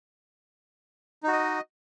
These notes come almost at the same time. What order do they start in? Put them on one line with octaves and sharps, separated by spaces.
D#4 F#4 D#5